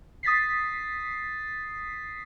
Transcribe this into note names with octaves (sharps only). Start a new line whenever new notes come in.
D#6 A6 B6 C7